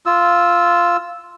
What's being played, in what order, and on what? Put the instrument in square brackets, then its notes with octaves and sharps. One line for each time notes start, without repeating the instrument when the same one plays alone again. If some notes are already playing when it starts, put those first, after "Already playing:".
[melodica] F4 E6